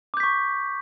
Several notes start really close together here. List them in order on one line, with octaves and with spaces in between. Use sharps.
D6 G6 B6 C#6